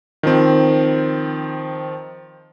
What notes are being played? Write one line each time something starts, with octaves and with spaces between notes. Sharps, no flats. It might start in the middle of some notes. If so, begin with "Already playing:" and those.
D#3 F3 C4